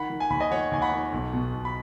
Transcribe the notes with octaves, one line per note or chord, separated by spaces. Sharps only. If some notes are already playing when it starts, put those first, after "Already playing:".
Already playing: D#3 F#5 B5
D#3
G#5
D#2 B5
D#5 G#5
D#3 C#5 F#5
D#2 G#5
F#5 B5
D#3
B1
B2
B1
B5